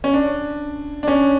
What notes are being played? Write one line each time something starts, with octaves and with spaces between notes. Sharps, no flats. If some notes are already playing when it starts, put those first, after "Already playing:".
C#4
D4
D4
C#4